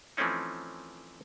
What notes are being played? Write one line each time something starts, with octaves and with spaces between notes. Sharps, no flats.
E3 F3 A3 C4 C#4 D#4